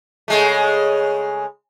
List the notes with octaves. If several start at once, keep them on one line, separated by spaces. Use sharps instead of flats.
C#3 G#3 A3